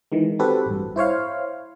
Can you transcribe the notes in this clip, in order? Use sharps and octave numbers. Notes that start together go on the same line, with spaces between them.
D#3 E3 G#3
C4 F#4 G4 A4 B4
A1 G2
E4 C5 C#5 F5